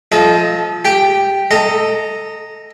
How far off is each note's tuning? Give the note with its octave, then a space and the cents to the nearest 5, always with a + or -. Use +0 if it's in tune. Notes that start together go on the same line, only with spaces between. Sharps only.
F3 +0 A4 -30 D#5 +10
G4 +0 G5 +0
A4 +0 D#5 +0 A#5 -25